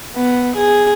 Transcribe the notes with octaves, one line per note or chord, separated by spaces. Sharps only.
B3
G#4